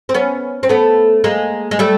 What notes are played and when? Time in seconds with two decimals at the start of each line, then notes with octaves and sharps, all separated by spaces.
0.09 C4
0.14 B3 C#4
0.63 C4
0.69 A3 B3
1.24 G#3 A#3
1.71 G#3
1.79 G3 A3